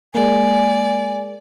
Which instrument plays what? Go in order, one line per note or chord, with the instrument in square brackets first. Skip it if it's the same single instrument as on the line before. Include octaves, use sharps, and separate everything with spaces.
[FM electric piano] G#3 A#3 [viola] D5 [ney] G#5